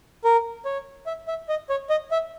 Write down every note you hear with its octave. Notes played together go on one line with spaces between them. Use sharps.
A#4
C#5
E5
E5
D#5
C#5
D#5
E5